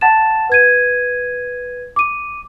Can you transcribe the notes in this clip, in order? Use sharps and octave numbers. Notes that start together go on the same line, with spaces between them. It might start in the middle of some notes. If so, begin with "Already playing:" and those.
F#5 A5 A6 E7
B4 G#6 D#7
D6 D#7